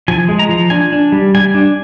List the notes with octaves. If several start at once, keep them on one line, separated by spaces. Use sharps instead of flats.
F3 G#5
G#3
A#5
F3
D4 G#5
D4
G3
G3 G#5
D4